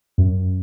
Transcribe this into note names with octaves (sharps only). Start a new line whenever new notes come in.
F#2